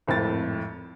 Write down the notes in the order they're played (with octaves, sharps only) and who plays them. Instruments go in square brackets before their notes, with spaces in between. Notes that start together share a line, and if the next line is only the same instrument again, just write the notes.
[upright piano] G#1 F2 A2 A6